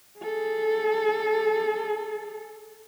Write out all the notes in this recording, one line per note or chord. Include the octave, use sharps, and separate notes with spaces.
G#4 A4